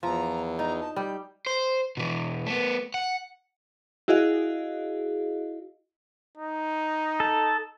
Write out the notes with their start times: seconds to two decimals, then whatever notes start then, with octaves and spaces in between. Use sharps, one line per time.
0.03 E2 F3 A#5
0.59 D#4 A#5
0.80 A5
0.96 G3 G6
1.46 C5
1.97 B2 E3
2.47 A3 B3
2.94 F#5
4.08 E4 F#4 G#4 D#5 F5
6.38 D#4
7.20 A4